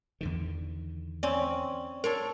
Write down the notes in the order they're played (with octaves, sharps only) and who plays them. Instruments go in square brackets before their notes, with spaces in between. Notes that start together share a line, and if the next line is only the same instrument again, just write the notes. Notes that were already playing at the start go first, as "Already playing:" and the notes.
[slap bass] E2 D3 D#3
[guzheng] C4 C#4 [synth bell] D5
[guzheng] A4 C#5 C6 [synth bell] A#4